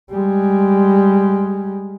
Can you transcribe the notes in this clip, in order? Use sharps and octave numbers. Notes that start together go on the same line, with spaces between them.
G3 G#3